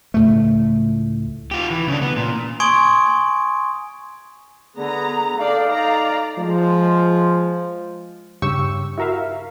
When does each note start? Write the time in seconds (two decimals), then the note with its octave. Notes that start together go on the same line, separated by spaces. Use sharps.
0.14 C#2 A2 A3
1.51 F4 G4
1.70 E3
1.88 C#3 D4
2.01 B3
2.17 A#2
2.60 G#5 C6 C#6 D#6 G#6 D7
4.76 D3 B3 G#4 A#5
5.38 D#4 A4 D5 F5
5.70 D5 A#5
6.38 F3 G#3
8.42 G2 C#3 G4 C#6 E6
8.98 E4 F#4 A#4 E5 F5